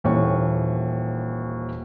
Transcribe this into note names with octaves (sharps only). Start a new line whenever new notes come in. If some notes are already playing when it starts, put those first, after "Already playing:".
D#1 D#2 E3 C#5 C#6